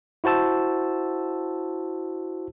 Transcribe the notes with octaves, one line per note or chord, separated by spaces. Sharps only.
E4 F#4 C5 A5 E6